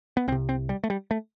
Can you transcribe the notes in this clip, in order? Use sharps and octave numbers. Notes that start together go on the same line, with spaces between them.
B3
C2 C3 C4
C4
G3
A3
G3
A3